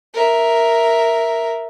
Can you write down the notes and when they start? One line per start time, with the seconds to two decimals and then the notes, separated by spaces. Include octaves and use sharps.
0.13 A#4 E5